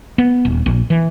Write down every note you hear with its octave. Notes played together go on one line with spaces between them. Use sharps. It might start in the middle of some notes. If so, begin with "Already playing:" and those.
B3
D#1
A#1
E3